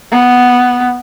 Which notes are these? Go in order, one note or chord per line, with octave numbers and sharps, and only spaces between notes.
B3